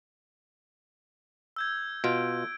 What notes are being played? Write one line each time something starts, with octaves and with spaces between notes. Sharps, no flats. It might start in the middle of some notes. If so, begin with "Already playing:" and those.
E6 G6 G#6
B2 F4 D7